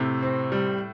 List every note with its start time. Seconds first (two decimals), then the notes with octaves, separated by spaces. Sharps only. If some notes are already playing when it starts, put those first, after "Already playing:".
Already playing: A2 C3
0.22 C4
0.52 G3